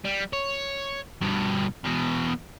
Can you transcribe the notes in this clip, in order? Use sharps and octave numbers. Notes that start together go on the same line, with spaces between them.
G3
C#5
G2 B2
E2 B2